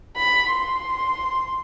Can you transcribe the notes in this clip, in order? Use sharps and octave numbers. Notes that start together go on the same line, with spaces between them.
B5
C6